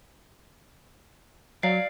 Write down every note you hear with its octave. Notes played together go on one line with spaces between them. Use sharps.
F#3 D5 F5 C7